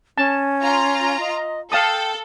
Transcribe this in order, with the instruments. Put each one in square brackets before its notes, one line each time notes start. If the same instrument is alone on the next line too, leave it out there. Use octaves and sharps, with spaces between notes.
[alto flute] C#4 [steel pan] A5
[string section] F4 A#5
[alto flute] D#5
[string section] A4 [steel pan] F5 A5 D#6 [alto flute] G5